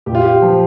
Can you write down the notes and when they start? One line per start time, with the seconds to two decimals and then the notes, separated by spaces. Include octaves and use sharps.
0.06 A#2 G4
0.15 F4
0.23 G4
0.42 F3